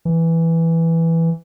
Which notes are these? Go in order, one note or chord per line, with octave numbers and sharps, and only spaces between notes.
E3